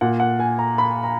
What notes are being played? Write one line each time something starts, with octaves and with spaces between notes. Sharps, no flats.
A#2 F#5
F#5
G#5
A#5
B5
A#5